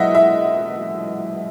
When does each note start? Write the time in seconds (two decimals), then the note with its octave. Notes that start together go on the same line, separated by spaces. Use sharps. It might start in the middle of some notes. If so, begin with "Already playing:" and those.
Already playing: F#2 E3 G#3 D#5 E5 F#5
0.15 E5